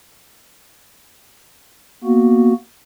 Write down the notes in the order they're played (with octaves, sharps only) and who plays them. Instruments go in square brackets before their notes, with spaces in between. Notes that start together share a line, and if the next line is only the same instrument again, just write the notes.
[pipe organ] A#3 B3 F#4